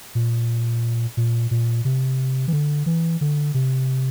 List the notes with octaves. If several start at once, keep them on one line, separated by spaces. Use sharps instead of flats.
A#2
A#2
A#2
C3
E3
D3
E3
D3
C3